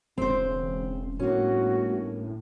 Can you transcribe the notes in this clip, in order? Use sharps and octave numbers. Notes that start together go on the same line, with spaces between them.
E1 C#3 C4 C5
G1 A2 A#3 C#4 F#4